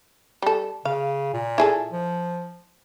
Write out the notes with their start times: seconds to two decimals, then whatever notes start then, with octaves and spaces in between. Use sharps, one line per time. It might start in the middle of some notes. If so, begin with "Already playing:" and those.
0.42 G3 A4
0.85 C#3 F5
1.34 A#2
1.58 E4 G#4 A4
1.92 F3